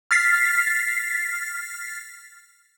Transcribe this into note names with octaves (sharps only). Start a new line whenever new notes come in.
F6 A6 B6 C7